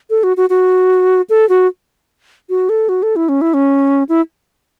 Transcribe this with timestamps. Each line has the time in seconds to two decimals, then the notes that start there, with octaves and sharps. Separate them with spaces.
0.10 A4
0.23 F#4
0.37 F#4
0.50 F#4
1.30 A4
1.49 F#4
2.50 F#4
2.69 A4
2.89 F#4
3.03 A4
3.16 E4
3.29 C#4
3.41 E4
3.54 C#4
4.09 E4